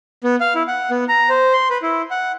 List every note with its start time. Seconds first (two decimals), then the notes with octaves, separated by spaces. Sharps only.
0.24 B3
0.41 F5
0.55 E4
0.68 F#5
0.90 B3
1.09 A#5
1.29 C5
1.53 C6
1.70 B4
1.82 E4
2.11 F#5